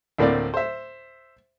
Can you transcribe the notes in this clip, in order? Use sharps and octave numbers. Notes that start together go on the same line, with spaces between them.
D2 A2 A#3 C4 D5
C5 E5